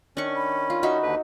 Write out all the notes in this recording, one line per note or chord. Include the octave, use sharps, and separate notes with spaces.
D#3 C#4 D4 C#6
B5
F4
D#4 F#4 E5
D#2 D3 B4